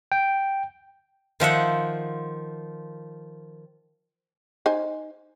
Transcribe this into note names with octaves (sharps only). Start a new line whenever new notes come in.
G5
D#3 F3 E5 F#5
D#4 C5 G#5